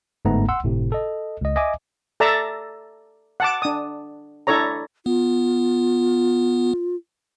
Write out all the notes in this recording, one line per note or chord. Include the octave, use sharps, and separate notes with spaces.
G1 G#2 A3 B3 A#5
F#5 C6 E6
G1 A2 C3
A4 D#5
C#2 D#5
D#5 E5 G#5 D6
A4 D5 E5 A5 A#5
F#5 A5 D6
D4 D#6
D4 E4 A4 C#5 A#5
B3 F4